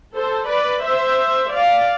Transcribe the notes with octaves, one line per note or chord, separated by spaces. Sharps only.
A4 C5
B4 D5
C5 E5
D5 F5